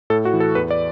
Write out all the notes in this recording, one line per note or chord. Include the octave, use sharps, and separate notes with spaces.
A2 A4
F#4
E3
A4
E2 B4
D5